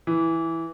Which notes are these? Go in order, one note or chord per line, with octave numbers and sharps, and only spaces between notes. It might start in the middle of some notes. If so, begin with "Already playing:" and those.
E3